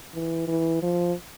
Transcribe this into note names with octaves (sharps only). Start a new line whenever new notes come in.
E3
E3
F3